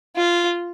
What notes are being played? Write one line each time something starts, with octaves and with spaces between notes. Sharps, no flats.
F4